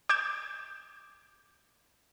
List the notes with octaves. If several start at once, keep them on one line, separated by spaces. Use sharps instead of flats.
D6 G6 G#6 E7